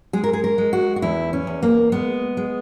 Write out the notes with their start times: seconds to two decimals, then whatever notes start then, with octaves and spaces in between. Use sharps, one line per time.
0.13 G#3 G#4
0.24 A#4
0.33 G#4
0.44 A#4
0.58 G#3
0.73 F#4
0.96 F#4
1.02 E2 E4
1.33 C#4
1.47 E2
1.63 A#3
1.92 G#3 B3
2.37 G#3